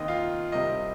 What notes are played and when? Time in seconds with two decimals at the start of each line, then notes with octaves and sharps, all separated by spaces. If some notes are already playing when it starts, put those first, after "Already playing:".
Already playing: D#2 D#3 C4 D#5
0.08 F4 F5
0.52 C2 C3 G3 C4 D#5